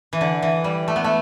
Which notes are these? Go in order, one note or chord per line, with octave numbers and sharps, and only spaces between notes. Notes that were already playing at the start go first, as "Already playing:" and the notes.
E3
D3
E3
G3
A3
B3
A3